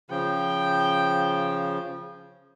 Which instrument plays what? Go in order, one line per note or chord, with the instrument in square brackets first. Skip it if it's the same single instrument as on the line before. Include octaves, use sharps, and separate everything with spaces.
[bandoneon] C#3 F3 [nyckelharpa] G5